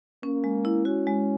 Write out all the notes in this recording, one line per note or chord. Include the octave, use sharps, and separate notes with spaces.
A#3 C#4
G#3
E4
C#4 F#4
G#3